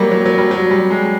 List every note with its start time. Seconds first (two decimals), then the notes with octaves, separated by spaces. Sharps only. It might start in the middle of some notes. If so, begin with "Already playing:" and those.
Already playing: F#3 G3 A#3
0.11 F#3
0.26 F#3
0.38 G3
0.51 F#3
0.71 G3
0.90 G#3